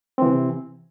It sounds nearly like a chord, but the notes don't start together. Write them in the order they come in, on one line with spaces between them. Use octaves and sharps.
C4 E3 C3